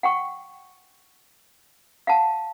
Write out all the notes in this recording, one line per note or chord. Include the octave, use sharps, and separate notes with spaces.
F#5 G5 C#6
F5 F#5 A5